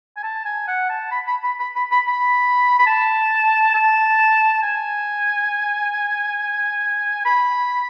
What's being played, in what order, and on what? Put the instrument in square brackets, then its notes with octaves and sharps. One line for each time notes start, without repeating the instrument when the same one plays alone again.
[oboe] G#5
A5
G#5
F#5
A5
B5
B5
B5
B5
B5
B5
B5
B5
A5
A5
G#5
B5